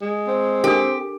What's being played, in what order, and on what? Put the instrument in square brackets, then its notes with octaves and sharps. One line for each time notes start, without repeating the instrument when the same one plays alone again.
[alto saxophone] G#3
[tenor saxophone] C4
[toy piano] D4 A4 A#4 [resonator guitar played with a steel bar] G4